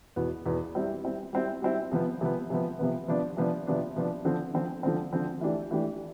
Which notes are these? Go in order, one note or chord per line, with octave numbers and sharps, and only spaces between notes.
E2 B2 B3
E2 B2 B3
G3 C4 E4
G3 C4 E4
G3 C4 E4
G3 C4 E4
C3 F3 B3
C3 F3 B3
C3 F3 B3
C3 F3 B3
C3 F3 B3 D4
C3 F3 B3 D4
C3 F3 B3 D4
C3 F3 B3 D4
D3 F3 C4
D3 F3 C4
D3 F3 C4
D3 F3 C4
E3 A3 D4 G4
E3 A3 D4 G4